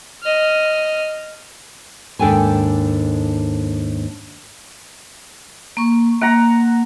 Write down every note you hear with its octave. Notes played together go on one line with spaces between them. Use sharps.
D#5 F6
D#2 G#2 D4 A4 G5 G#5
A#3 C#6
A#3 F#5 A#5